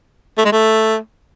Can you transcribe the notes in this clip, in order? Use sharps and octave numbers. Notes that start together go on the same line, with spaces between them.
A3
G#3
A3